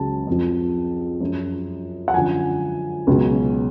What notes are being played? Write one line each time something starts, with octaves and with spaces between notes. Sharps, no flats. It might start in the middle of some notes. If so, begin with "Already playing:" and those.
Already playing: C#2 C#3 F#3 A5
F2 F3
F#2 F3
F#5
F#2 D3 F3 G#5
C#2 B2 F#3